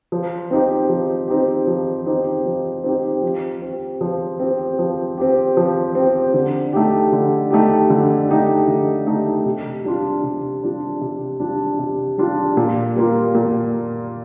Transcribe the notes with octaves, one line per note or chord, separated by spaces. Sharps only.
F3
C4 D#4 G4
F3
C4 D#4 G4
F3
C4 D#4 G4
F3
C4 D#4 G4
F3
C4 G4
F3
C4 G4
F3
C4 G4
F3
C4 G4
D3
A3 D#4 G4
D3
A3 D#4 G4
D3
A3 D#4 G4
D3
A3 D#4 G4
C3
G3 D4 F4
C3
G3 D4 F4
C3
G3 D4 F4
C3
G3 D4 F4
A#2
G3 A#3 F4
A#2